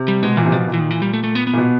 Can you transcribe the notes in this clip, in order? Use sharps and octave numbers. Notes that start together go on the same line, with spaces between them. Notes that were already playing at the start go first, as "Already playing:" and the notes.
Already playing: C3
G3
B2 G#3
A#2 E3
C3
B2 F3
A#2
E3
D#3
E3
G3
A3
A3
B3
B3
A#2
B2